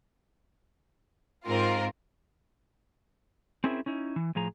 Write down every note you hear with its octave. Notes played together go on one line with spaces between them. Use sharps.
G#2 C4 F4 A#4
C4 C#4 E4 G#4 A#4 E5
C#4 D#4 E4
E3
A2 F3 G#4 A#5